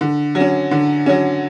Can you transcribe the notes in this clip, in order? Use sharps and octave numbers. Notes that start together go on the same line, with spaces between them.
D3
F#3
C#4
D3
F#3 C#4